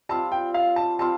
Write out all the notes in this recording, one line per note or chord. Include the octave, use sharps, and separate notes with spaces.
G3 C4 F4 A5
G5
F5
A5
G3 C4 F4 A5